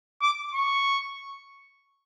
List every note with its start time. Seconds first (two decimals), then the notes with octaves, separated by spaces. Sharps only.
0.22 D6
0.54 C#6